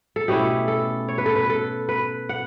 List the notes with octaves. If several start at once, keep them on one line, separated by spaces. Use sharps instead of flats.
A4
B2 A3 C#4 E4 G4
A4
C#5
B4
A4
B4
A4
B4
F#5